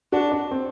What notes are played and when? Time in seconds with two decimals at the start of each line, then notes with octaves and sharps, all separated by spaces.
0.12 D4 F#4
0.32 D4
0.51 C4